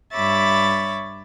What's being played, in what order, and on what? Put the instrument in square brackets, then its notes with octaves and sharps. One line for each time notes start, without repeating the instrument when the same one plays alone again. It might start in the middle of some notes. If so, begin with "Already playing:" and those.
[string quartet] G2 C#5 E5 B5 D6 A6